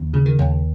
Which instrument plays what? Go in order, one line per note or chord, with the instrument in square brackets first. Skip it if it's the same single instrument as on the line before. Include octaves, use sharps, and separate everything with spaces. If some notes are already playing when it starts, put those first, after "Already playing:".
Already playing: [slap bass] D#2
C#3
D#3
D#2